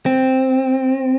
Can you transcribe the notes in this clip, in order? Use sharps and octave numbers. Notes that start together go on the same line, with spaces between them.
C4